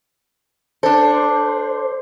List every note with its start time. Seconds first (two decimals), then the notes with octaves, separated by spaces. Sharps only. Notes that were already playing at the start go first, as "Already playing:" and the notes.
0.83 D4 A4 C5